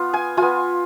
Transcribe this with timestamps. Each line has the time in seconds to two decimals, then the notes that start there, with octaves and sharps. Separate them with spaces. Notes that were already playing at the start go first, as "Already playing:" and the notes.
Already playing: B3 F4
0.14 G#5
0.37 B3 F4 G#5